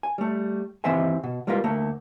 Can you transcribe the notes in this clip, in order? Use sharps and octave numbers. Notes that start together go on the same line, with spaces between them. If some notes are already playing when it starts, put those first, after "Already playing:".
G#5
G3 A3
D#2 E3 C4 C5 E5 G#5
B2
G3 G#3 A#3 F4 A#4 B4
D2 A3 A#3